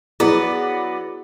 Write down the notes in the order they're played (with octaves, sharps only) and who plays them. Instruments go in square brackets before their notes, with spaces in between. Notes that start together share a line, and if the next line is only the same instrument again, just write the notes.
[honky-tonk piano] F#3 D5 [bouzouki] B3 [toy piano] E4 G#4